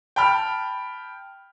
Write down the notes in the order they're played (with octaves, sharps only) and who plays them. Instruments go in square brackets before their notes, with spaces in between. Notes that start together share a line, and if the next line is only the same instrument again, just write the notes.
[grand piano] G5 A5 B5 F6